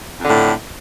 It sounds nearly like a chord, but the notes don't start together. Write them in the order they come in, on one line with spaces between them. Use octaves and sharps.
F2 D3 A2